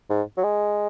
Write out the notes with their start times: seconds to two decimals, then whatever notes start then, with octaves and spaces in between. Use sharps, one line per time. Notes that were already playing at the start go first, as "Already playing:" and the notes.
0.10 G#2
0.37 F#3
0.44 G#3